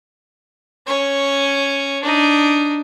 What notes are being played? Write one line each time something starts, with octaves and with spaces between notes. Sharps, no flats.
C#4 C#5
D4 D#4